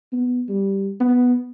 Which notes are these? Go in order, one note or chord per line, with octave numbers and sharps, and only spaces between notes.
B3
G3
B3